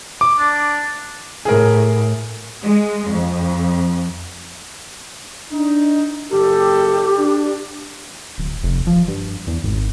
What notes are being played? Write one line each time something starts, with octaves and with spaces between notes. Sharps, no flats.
D6
D4
A2 G#4 A#4
G#3
F2
D4 D#4
F#1 G4 A4
D4
D1
F1
F3
G2
E2
G#1